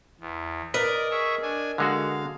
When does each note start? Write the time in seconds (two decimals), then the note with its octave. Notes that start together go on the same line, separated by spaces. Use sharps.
0.20 E2
0.74 A#4 B4 D5 D#5
1.11 G#4 E5 C#6
1.42 D4 G#5
1.78 D3 G#3 F#4 F5